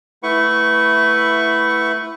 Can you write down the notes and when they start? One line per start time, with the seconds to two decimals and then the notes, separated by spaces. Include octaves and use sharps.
0.23 A3 E4 B4 F#5 C#6